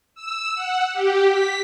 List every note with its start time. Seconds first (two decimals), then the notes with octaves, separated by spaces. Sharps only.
0.15 E6
0.55 F#5
0.93 G4
1.28 B6